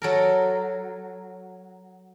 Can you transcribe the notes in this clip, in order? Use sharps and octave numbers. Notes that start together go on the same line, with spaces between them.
F#3 A4 A#4